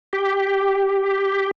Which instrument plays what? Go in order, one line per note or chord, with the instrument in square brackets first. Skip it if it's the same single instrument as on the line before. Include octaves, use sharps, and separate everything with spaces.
[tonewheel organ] G4